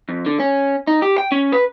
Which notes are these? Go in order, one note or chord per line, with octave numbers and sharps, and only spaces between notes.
F2
D3
C#4
D#4
G4
G5
C#4
B4